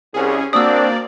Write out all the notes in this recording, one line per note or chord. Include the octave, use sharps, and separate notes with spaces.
C2 C#4 G#4
A#3 C4 D4 F#4 D5 D#6 E6